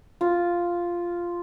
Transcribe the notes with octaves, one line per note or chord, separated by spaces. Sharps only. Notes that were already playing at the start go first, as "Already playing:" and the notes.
F4